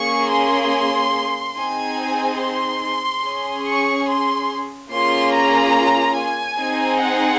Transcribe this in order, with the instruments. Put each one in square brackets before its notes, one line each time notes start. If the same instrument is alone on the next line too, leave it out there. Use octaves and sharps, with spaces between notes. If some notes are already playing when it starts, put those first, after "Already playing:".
Already playing: [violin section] A#3 C#4 G#4 C#6
C6
C4 D#4 G#4 G#5
C6
C#4 G#4
C#6
C6
A#3 C#4 F4 G#4 C6
A#5
G#5
C4 D#4 G#4
F#5